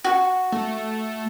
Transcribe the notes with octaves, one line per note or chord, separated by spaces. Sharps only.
F#4
A3